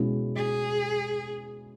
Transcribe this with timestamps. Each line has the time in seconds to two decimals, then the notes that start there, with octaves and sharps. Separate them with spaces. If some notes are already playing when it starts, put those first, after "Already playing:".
Already playing: B2 G#3 C#4 E4
0.36 G#4